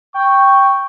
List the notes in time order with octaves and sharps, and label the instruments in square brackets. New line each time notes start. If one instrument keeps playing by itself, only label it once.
[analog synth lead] G5 [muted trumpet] C#6